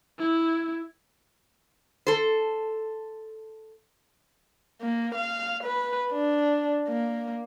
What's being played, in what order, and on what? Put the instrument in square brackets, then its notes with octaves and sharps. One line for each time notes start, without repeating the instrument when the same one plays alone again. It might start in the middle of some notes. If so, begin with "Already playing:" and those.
[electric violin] E4
[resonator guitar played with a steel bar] A4 C5
[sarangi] A#3
F5
B4
D4
A#3